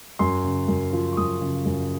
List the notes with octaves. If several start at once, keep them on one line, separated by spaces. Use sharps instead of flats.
F#2 C6
C#3
F#2
F3
C#6
F#2 D#6
C#3
F#2